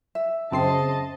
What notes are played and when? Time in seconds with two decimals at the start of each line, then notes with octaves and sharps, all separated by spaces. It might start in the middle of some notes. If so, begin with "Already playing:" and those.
0.15 E5
0.52 F#2 C#3 C4 D#5 A5 C7